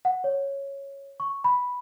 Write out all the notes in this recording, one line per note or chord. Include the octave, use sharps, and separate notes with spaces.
F#5
C#5
C#6
B5